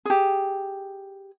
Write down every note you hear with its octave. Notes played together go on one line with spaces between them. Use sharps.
G4 G#4